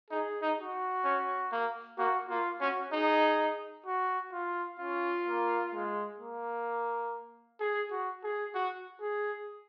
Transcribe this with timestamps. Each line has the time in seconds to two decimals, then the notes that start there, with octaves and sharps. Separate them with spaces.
0.10 D#4 G#4
0.42 D#4
0.58 F#4
1.04 C#4
1.52 A#3
1.98 A#3 F#4
2.29 A#3 F4
2.61 C#4 F#4
2.91 D#4 G#4
3.86 F#4
4.32 F4
4.79 C#4 F4
5.26 A#3
5.74 G#3
6.19 A#3
7.60 G#4
7.91 F#4
8.23 G#4
8.55 F#4
9.00 G#4